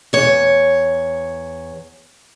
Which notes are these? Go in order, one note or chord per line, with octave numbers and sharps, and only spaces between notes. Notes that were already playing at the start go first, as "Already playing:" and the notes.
E2 C#5